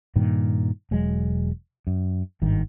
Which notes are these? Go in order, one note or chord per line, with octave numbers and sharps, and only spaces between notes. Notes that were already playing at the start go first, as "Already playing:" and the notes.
G2 A#2 D#3
E1 F#3 G#3
F#2
G#1 G2 D#3